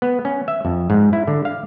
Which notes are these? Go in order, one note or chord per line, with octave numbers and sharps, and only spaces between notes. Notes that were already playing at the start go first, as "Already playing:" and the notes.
B3
C#4
E5
F2
G#2
E4
D3
F5